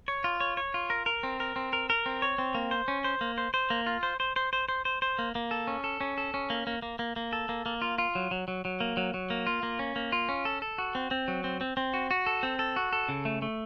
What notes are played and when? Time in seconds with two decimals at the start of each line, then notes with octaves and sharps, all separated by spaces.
0.08 C#5
0.24 F4
0.40 C#5
0.57 C#5
0.74 F4
0.90 A#4
1.06 A#4
1.23 C4
1.40 A#4
1.56 C4
1.73 A#4
1.90 A#4
2.06 C4
2.22 C#5
2.38 C4
2.55 A#3
2.71 C5
2.88 C#4
3.04 C5
3.21 A#3
3.38 C5
3.54 C5
3.70 A#3
3.86 F4
4.03 C5
4.20 C5
4.36 C5
4.53 C5
4.68 C5
4.85 C5
5.02 C5
5.19 A#3
5.35 A#3
5.51 A4
5.67 C#4
5.84 A4
6.01 C#4
6.18 A4
6.34 C#4
6.50 A#3
6.67 A#3
6.82 A#3
6.99 A#3
7.16 A#3
7.33 A4
7.49 A#3
7.66 A#3
7.82 F4
7.98 F4
8.15 F#3
8.31 F#3
8.48 F#3
8.65 F#3
8.80 A#3
8.97 F#3
9.14 F#3
9.30 A#3
9.47 F4
9.63 A#3
9.79 C#4
9.96 A#3
10.12 F4
10.29 C#4
10.45 A4
10.62 A4
10.78 F#4
10.95 C4
11.11 C4
11.28 F#3
11.44 C4
11.61 C4
11.77 C4
11.94 F#4
12.11 F#4
12.26 A4
12.43 C4
12.59 A4
12.76 F#4
12.93 A4
13.09 C#3
13.25 A3
13.42 A3